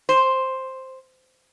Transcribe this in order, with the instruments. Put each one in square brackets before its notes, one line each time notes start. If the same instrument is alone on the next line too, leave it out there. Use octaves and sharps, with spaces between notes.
[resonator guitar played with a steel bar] C5